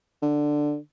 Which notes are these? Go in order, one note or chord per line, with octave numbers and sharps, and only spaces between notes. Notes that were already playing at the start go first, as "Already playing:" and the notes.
D3